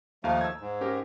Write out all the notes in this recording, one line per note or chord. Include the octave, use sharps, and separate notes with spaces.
D#2 F3 A3 D#4 F5
E6 G#6
G#2
C#4 G4 A#4